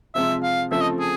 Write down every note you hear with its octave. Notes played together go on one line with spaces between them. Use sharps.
C3 F3 G#3 C4 F4 E5
F5
C#3 F3 A3 C4 E5
D#5
G#4